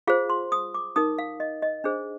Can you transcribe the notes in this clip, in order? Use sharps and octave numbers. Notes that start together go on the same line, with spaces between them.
F4 G#4 C5 F5
C6
D#6
D6
D#4 A#4 D#6
F5
D#5
D#5
D4 G#4 C5